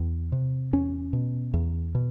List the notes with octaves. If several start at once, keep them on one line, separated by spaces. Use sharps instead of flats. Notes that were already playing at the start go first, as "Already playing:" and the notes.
Already playing: E2
C3
E2 C#4
B2
E2
B2